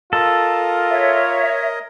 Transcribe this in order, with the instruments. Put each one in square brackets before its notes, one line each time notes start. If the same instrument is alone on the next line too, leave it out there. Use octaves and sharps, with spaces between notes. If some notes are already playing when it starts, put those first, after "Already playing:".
[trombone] F4 [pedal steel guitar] A4 [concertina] A#4 D#5
[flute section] C#5 E5